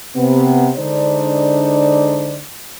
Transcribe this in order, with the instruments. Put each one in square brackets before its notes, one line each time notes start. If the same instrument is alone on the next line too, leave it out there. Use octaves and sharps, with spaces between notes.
[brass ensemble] C3 B3
D3 G#3 D4 D#4 C5 D5